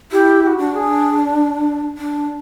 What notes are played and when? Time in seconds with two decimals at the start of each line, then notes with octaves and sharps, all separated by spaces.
0.12 E4 G4
0.43 G4
0.47 F#4
0.58 D4
0.74 G#4
1.98 D4